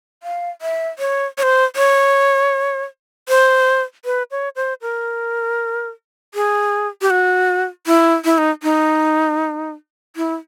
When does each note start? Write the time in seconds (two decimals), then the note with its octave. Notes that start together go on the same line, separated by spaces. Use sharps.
0.23 F5
0.62 E5
0.99 C#5
1.38 C#5
1.43 C5
1.76 C#5
3.29 C5
4.05 B4
4.31 C#5
4.56 C5
4.82 A#4
6.35 G#4
7.01 G4
7.10 F#4
7.87 E4
8.25 E4
8.38 D#4
8.63 D#4
10.16 E4